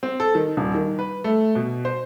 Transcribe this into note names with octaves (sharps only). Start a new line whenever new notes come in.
C4
A4
D#3
D#1
D#3
B4
A3
B2
C5